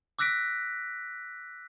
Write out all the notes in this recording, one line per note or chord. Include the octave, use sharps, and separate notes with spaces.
D6 E6 F#6 A#6 B6 D7